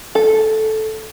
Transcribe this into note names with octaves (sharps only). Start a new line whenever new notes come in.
A4